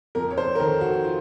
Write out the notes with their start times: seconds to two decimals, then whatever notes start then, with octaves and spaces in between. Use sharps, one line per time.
0.15 F2 A#4
0.31 C#5
0.38 C5
0.55 A#4
0.60 D#3 A4
0.81 F#4
1.04 F4